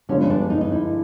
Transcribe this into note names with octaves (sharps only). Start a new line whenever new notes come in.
G2 D3 F3 G#3 B3 C#4
D4
D#4
D#4
E4